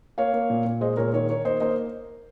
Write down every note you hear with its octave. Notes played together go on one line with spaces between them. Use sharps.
A#3 C#5 F5
A#3
A#2
A#2
G#3 C5 D#5
A#2 A#4 C#5
D#3 A#4 C#5
D#3 A#4 C#5
A#3 C5 D#5
A#3 C5 D#5